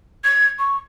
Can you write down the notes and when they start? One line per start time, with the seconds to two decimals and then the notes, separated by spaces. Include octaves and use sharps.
0.24 G#6
0.59 C#6